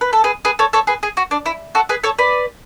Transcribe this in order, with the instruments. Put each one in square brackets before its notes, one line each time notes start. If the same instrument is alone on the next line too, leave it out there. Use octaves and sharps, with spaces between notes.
[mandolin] B4
A4
G#4 B4
G#4 B4
A4 C#5
A4 C#5
G#4 B4
G#4
F#4
D4
E4
F#4 A4
G#4 B4
A4 C#5
B4 D5